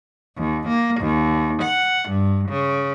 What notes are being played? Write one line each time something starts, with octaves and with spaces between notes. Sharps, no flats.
D#2
A#3
D#2
F#5
G2
C#3